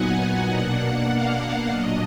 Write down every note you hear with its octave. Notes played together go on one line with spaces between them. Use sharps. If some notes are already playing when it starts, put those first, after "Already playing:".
Already playing: A#2 F#3 B3 D#4 F#5 G#5
B2 A#3 D4 F#5
F5
A#2 F#3 D4 D#5